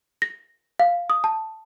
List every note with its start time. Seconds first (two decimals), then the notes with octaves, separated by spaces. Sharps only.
0.22 A#6
0.80 F5
1.10 D#6
1.24 A5